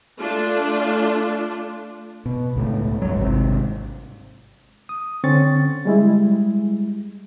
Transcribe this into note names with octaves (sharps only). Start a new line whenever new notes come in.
A3 D4 F4
B2
C#2 A2
G2 F#3
G#1 C3
D#6
D3 C4 C#4 C#6 A6
G3 G#3 E4